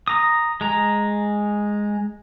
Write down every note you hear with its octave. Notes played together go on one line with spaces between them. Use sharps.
A#5 D#6
G#3 A#5